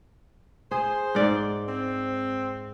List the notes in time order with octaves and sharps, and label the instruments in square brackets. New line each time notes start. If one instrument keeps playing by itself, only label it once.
[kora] G#4 [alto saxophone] C5
[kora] G#2 D5
[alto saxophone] C4